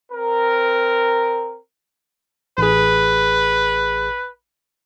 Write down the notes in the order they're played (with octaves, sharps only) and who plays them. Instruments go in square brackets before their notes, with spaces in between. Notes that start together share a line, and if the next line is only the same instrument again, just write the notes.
[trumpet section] C4 A#4
[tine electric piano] A1 G#4 [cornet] B4